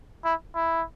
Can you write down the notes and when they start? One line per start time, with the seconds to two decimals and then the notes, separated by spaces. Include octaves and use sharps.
0.25 E4
0.55 E4